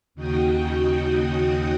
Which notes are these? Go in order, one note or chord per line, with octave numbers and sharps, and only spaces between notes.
D#2 C#3 D#4 F#4 G5 D#6